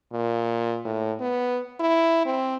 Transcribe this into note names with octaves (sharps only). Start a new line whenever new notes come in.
A#2
A2
B3
E4
C4